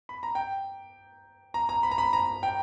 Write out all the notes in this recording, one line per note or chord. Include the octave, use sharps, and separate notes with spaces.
B5
A#5
G5
A#5
A#5
B5
A#5
B5
A#5
G5